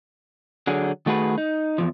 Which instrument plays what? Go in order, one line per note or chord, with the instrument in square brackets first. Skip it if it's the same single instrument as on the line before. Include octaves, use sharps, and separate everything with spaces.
[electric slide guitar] D3 F#3 G#4
D#3 A3 F#4 G#4 B4
D#4
E2 A#2 F3